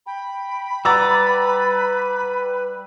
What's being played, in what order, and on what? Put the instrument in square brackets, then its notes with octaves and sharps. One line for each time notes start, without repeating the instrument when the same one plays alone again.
[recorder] G5 [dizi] B5
[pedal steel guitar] G3 D5 [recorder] B4 [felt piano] F#5 A#5 E6